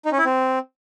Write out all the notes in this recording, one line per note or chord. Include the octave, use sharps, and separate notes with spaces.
D#4
C#4
E4
C4